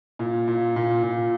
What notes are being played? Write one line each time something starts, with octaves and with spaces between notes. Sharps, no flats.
A#2
A#2
A#2
A#2